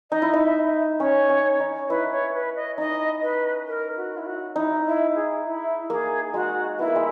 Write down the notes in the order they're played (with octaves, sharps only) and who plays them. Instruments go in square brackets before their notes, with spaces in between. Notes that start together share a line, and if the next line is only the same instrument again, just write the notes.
[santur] D#4 [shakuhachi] D#5
[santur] E4
D#4
[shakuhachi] E5
[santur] C#4 [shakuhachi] C#5
[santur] C#4
D#4
[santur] E4 [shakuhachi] B4
[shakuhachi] C#5
B4
D#5
[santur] D#4 [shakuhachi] D#5
[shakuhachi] B4
A#4
F#4
E4
F#4
[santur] D#4 [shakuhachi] E4
[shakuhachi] E4
G#4
E4
[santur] A#3 [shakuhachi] G#4
[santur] G#3 [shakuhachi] F#4
[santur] B3 [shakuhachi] E4
[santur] A#3
G#3